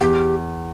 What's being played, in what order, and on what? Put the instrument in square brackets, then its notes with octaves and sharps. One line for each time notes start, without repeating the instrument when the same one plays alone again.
[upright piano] E2 [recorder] G4